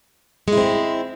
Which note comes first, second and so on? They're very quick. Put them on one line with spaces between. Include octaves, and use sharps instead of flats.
G#3 E4 C4